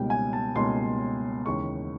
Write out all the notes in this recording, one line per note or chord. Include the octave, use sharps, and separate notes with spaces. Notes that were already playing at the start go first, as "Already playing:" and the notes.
Already playing: C#2 B2 G3 A#3 D#4 G5
G#5
A5
C#2 B2 G3 A#3 D#4 C6
D#2 C#3 E3 G#3 C#6